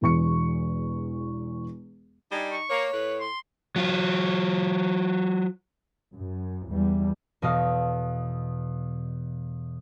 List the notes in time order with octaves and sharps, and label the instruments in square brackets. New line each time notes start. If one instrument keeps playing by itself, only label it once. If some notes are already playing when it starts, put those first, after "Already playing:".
[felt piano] E1 E2 C#6 C#7
[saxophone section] G3 D4 [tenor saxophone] D#4 [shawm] G#5
[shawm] C#6
[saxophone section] A#3 [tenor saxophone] C#5
[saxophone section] A2 [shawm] B4
[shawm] C6
[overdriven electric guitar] F#3 F4
[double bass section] F#2
E2 E3 G3
[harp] E2 B2 A4 D#5 F5